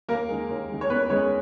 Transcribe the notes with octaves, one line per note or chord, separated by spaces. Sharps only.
D#2 A#3 A#4
D#3 G#3
D#2
D#3 G#3
C#5
D#2 B3 B4
D#3 G#3 C#4 C#5